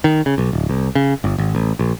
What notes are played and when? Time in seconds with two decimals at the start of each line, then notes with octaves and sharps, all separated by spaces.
0.04 D#3
0.26 C#3
0.38 B1
0.53 D1
0.69 C2
0.95 C#3
1.24 G1
1.38 G#1
1.55 A1
1.79 A#1